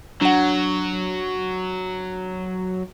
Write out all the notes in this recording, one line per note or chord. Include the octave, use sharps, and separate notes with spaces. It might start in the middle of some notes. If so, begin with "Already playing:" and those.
F#3 D4 F#5